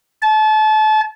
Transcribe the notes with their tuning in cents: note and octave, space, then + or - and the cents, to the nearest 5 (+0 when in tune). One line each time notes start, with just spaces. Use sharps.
A5 -30